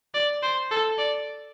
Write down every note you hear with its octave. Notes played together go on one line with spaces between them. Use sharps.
D5
C5
A4
D5